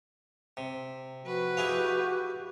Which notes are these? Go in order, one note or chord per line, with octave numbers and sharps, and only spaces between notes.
C3
F3 F#4 B4
E4 G4 G#4 F5